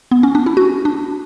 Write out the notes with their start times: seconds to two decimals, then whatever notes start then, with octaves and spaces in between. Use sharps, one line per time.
0.11 B3
0.23 C#4
0.35 D4
0.46 E4
0.57 F#4
0.85 D4